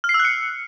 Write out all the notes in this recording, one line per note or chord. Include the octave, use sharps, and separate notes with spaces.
F6
C7
E6
F#6
C#7